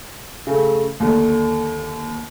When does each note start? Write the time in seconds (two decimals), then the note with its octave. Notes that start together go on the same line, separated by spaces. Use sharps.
0.47 C#3 A3
1.00 D#2 D3